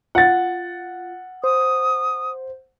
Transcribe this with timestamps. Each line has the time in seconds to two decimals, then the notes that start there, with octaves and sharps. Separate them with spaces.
0.15 F4 F#5 A6
1.44 C5 D#6